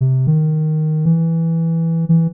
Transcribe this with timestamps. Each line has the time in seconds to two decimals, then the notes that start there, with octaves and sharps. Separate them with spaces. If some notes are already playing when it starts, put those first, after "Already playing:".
0.01 C3
0.27 D#3
1.05 E3
2.09 E3